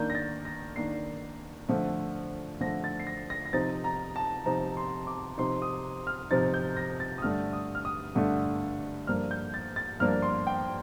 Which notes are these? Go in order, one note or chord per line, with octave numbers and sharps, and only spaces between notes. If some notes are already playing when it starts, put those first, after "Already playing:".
Already playing: D#3 A#3 D4 G6
A#6
A6
A#6
D#3 A#3 D4 C7
D3 F3 A3
D3 F3 A3 A#6
A6
C7
A#6
A#6
A#6
C3 F3 C4 D#4 A6
A#5
A5
C3 F3 C4 D#4 A#5
C6
D6
C3 F3 C4 D#4 C6
D#6
F6
C3 F3 C4 D#4 A6
G6
A#6
A6
D#6
G2 D3 A3 D4 F6
D#6
F6
D#6
G2 D3 A3 D4
G2 F3 A#3 D4 F6
G6
A6
A6
G2 F3 A#3 D4 F6
C6
G5